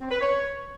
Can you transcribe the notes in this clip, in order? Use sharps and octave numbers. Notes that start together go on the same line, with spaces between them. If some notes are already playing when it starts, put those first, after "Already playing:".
C4
B4
C#5